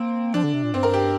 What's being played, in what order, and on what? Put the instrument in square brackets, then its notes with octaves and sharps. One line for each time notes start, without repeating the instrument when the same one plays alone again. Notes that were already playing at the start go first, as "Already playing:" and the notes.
Already playing: [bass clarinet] A#3 [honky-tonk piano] C4
[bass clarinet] F3 [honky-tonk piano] D4
[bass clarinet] D3
C3
A#2
[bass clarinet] G2 [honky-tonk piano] C4
[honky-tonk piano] A#4
G4